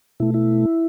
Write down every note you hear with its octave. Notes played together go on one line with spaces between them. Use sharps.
B2 A3 E4
E4